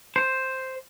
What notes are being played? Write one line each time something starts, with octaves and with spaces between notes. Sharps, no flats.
C5